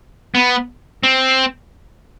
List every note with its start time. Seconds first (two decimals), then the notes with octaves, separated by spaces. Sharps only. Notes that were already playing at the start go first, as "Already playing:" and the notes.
0.35 B3
1.03 C4